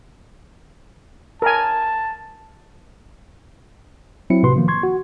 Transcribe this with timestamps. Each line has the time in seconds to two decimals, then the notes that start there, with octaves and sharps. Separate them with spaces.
1.42 A#4 G#5 A5
4.30 F#3 C4 E4 C#7
4.43 A2 C3 F#4 B4 C6
4.56 D#3 F3 A#3
4.68 C6 C#6 G#6
4.83 F#4